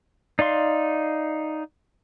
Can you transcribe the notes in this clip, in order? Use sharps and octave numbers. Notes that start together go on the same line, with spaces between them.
D#4 D5 F5 C6